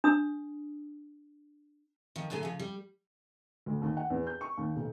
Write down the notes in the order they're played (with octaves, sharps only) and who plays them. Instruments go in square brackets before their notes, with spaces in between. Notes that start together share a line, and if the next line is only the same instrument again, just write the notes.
[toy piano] D4 D#6
[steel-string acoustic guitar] D#3 F3
A2 D3 F#3 G#4 G#5
C#3 F3
G3
[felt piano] D2
D#2
F#5
E2
G6
C#6
D#2
B1